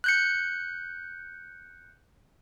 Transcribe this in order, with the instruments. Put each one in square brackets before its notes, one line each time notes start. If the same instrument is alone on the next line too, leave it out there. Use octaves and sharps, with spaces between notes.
[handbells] F#6 G6 C#7